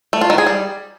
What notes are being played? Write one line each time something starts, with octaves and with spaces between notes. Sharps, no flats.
A3
F4
D#3
G#4
G3